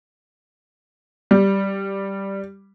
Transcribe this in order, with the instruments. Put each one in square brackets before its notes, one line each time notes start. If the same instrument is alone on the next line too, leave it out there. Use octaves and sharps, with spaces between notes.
[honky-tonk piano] G3